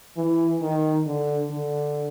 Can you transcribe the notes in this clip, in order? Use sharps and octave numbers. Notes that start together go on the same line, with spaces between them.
E3
D#3
D3
D3